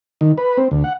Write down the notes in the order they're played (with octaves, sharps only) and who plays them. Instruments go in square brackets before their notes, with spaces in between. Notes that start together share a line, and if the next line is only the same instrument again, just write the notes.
[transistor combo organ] D#3
B4
C4
D2
F#5